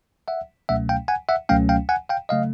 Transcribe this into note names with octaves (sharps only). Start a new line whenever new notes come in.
E5 F#5
C#2 B2 F#3 A3 C#4 E5 F#5
F5 G5
F#5 G#5
E5 F#5
C#2 B2 F#3 A3 C#4 F5 G5
F5 G5
F#5 G#5
F5 G5
C#3 F#3 A3 D#5 F5